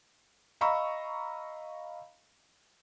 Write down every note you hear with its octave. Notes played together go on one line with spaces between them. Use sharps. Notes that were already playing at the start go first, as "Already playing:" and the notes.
D#5 F5 A#5 B5 C#6 E6